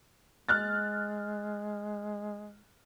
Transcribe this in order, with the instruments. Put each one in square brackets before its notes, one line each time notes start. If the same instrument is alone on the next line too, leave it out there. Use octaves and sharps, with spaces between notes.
[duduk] G#3 [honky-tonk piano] F6 F#6 A6